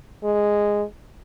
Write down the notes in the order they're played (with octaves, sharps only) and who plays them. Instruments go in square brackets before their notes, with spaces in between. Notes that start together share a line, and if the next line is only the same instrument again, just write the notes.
[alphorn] G#3